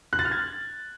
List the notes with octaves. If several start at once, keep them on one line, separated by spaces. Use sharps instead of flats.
F#6
A6
F6
G#6